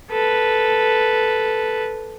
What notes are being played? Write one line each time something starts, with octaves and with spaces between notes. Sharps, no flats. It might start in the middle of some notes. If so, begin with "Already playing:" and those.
A4 B4